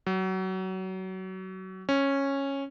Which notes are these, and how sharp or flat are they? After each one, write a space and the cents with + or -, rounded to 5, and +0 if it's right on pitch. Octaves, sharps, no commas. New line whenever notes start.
F#3 +25
C#4 -10